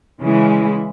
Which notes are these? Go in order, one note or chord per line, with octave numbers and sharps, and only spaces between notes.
C#3 E3 G#3 E4